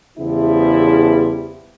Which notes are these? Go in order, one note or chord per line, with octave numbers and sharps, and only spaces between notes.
E2 C#3 F3 G3 B3 E4